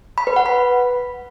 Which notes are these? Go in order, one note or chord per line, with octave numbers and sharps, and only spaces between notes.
B5
B4
F#5
B5